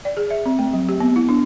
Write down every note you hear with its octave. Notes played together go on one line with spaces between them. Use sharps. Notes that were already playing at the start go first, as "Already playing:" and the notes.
D5
G#4
E5
C4
A3
F#3
G4
B3
E4
D4